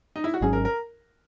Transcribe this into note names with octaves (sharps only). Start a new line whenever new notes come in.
D#4
E4
F#4
G#1 G#2 F#3 C#4 G#4
A#4
A#4